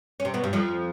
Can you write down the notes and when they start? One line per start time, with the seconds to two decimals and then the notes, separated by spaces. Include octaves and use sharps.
0.20 C#4
0.25 C3 C4
0.34 B2 B3
0.44 G2 G3
0.53 F2 F3